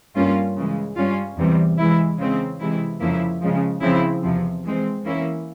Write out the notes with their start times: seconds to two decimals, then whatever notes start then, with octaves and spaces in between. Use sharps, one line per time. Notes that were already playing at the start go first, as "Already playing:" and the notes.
0.15 G2 G3 A#3 C#4 F4
0.56 C#3 E3 G#3
0.97 G2 G3 C#4 F4
1.38 E2 C3 E3 G3
1.78 E3 G#3 E4
2.19 C#3 E3 G#3 C4
2.60 C3 E3 G#3 E4
3.00 F2 C#3 F3 A#3 E4
3.41 C#3 F3 G#3
3.82 C#3 F3 C4 E4
4.23 E2 C3 F3
4.64 E3 G#3 C4
5.04 E3 A#3 C#4 E4